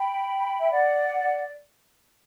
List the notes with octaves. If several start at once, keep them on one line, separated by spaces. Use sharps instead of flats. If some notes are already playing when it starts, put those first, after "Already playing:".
Already playing: G5 B5
E5
D5 F#5